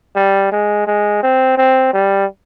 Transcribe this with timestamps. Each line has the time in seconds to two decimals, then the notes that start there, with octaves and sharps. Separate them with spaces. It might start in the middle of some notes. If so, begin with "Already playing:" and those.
0.16 G3
0.51 G#3
0.87 G#3
1.23 C4
1.58 C4
1.93 G3